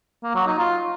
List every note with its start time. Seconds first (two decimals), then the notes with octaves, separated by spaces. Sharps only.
0.23 A#3
0.35 F#3
0.47 D#4
0.58 F4